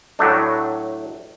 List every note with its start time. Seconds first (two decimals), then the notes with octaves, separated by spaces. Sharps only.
0.19 A2 F#3 A3 D4